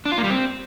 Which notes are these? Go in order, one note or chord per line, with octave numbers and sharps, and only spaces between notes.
D4
F4
A#3
G3
C4